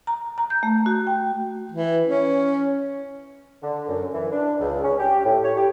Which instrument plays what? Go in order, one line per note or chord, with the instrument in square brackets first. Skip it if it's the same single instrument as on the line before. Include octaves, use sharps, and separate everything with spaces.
[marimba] A#5
A#5
G6
A3
F#4
G5
[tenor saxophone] E3
C#4
[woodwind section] D3
F#2
E3
D4
C#2
C#4
G4
A2
C#5
G4